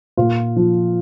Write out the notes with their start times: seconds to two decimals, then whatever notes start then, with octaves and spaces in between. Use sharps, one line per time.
0.17 A#2 F4
0.56 F3